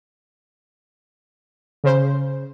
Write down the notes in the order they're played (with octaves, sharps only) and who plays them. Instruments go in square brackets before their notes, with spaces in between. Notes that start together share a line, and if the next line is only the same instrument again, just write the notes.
[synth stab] C#3 C5